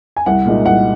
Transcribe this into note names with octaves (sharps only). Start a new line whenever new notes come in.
G#5
C2 F#5
A#2 G#3 D#4
C2 F#5